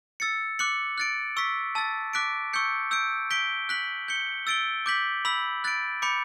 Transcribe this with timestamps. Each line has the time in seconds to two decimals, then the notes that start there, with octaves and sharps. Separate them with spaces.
0.20 E6 A6 C#7
0.59 D6 F#6 C#7 F#7
0.98 F#6 A6 D7
1.37 C#6 E6 B6
1.75 A5 E6 A6
2.13 D6 F#6 B6 D7
2.53 C#6 E6 G6 C#7
2.91 E6 G6 D7
3.30 G6 B6 D7 G7
3.69 F#6 B6 F#7
4.08 G6 C#7 G7
4.47 E6 A6 D7 G7
4.86 D6 G6 B6 F#7
5.25 B5 E6 B6 F#7
5.64 F#6 A6 D7
6.02 B5 D6 G6 C#7